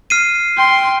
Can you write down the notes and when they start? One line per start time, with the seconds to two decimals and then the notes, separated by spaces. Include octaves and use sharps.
0.10 F6 C7 D#7
0.58 G5 C6